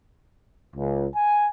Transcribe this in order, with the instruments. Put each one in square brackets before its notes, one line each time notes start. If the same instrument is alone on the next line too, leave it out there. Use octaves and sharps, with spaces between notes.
[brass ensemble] C#2
G#5